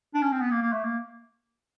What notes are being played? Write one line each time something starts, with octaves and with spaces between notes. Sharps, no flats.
D4
C#4
C4
B3
A#3
A#3
A3
A#3